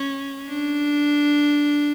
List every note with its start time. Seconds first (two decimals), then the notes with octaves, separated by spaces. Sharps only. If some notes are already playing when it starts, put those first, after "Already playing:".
Already playing: C#4
0.48 D4